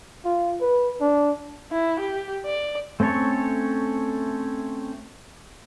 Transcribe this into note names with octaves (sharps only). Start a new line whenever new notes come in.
F4
B4
D4
E4
G4
D5
A3 C4 C#4 A4 C#5